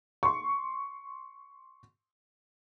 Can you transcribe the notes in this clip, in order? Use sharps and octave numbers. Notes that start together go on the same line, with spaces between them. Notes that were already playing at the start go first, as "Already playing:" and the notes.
C6 C#6